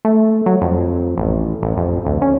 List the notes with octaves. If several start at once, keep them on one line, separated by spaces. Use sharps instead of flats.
A3
F#3
F2
A1
A1
F2
D2
C#4